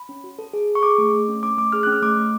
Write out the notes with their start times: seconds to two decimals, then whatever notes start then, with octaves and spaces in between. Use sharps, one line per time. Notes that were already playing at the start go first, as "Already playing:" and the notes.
Already playing: B5
0.09 C#4
0.24 F#4
0.39 A4
0.53 G#4
0.68 G#4
0.75 C#6
0.83 G#4 D6
0.98 A3
1.13 A3
1.28 C#4
1.43 C#4 D6
1.58 A3 D6
1.72 G#4 F6
1.83 C#4 F#6
1.93 F6
2.02 A3 D6
2.17 A3